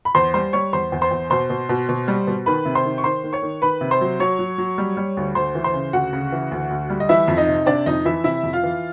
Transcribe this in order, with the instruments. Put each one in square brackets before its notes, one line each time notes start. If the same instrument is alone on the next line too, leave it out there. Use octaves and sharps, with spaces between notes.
[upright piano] B5
E2 C5 C6
G3 C5 C6
G3 C#5 C#6
E2 C5 C6
E2
C5 C6
E2
B2 C5 C6
B2
B2
B2
G3
B2
D#3 B4 B5
C3
C5 C6
D#3
C#6
D#3 C5 C6
D#3
C#5 C#6
D#3
D#3 B4 B5
C3
C5 C6
F#3
F#3 C#5 C#6
F#3
F#3
G3
G3
D2
D2 C5 C6
E3
C5 C6
C#3
D2 F#4 F#5
C#3
E3
D2
D2
G3
D#5
E3 E4 E5
F2
D#4 D#5
C3
C3 D4 D5
F2 D#4 D#5
E3 E4 E5
C3 E4 E5
F2
F4 F5
E3